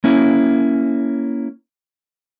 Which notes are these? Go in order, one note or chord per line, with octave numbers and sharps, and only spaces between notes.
A#3 C#4 E4